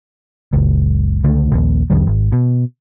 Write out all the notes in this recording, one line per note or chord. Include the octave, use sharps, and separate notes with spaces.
F#1 C#2
C#2 D3 A3
A#1 D#2
C2 F2 D#3 G3
G#1
B2